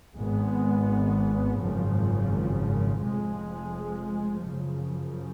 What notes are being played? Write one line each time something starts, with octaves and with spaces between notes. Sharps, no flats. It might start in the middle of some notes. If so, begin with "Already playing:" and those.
G#1 G#2 G#3 B3
G#1 F#2 C#3 F3
F1 F2 F3 G#3
F#2 C#3 F3